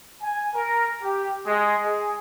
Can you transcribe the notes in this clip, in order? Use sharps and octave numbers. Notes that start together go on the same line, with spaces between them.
G#5
A#4
G4
G#3
G#4